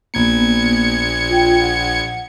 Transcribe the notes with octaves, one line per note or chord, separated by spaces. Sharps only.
A#1 A#3 B3 G#6 C#7
F4 G5
F#5